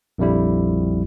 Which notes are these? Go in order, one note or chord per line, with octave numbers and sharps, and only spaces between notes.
A#1 F2 G3 E4